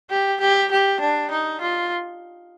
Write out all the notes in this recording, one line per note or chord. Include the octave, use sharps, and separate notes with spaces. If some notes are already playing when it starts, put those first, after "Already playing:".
G4
G4
G4
D4
D#4
F4